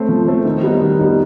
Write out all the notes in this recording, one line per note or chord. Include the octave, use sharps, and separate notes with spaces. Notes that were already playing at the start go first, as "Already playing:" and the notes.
Already playing: A3 C4
F3
A3 C4
D#3
G3 B3 D#4
D#3
G3 B3 D#4